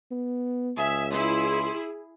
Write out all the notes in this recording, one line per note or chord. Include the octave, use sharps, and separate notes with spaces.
B3
C#2 G#4 E5
E4 G#4 C6